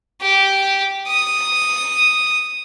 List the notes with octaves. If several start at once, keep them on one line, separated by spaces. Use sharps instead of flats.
G4
D#6